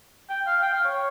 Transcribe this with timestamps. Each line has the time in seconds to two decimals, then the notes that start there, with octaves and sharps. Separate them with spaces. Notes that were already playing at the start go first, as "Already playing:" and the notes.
0.29 G5
0.46 F5
0.62 G5
0.73 F5
0.85 C#5